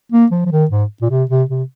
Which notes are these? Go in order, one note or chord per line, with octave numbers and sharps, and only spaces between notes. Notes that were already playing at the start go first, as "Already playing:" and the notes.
A#3
F3
F3
D#3
G#2
A#2
C3
C3
C3